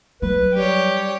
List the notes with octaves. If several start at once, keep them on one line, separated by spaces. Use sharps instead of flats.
F#3 B4
G3 G4 C#5